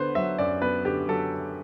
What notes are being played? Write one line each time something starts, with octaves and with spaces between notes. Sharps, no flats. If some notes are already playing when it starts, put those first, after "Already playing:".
Already playing: D3 B3 B4 C5
F#3 E5
F#2 D5
B3 B4
D3 G4
F#3 A4